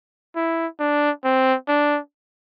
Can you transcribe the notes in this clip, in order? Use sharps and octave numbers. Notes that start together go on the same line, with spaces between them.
E4
D4
C4
D4